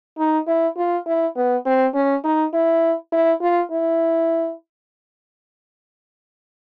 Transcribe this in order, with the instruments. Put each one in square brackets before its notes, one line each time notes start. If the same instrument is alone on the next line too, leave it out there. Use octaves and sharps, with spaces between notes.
[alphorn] D#4
E4
F4
E4
B3
C4
C#4
D#4
E4
E4
F4
E4